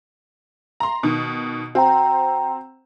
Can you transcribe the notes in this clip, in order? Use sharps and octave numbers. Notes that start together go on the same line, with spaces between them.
A#5 C6
B2 D#3
C4 F#4 G5 A#5